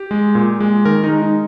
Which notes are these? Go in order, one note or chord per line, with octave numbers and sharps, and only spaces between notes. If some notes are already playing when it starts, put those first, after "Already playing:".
Already playing: G4
G#3
A#2
G#3
D#3 A#4
D#4
G#3
D#4